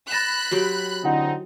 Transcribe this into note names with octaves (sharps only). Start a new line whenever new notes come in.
B5 F#6 A6 A#6 E7
F#3 G4 C6
D3 C4 D#4 E4 F#5